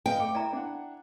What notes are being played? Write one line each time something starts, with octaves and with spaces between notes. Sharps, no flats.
B4 D#5 F5 G5
A3 D6 C#7
E4 D5 E5 A#5
D4 E4 F#5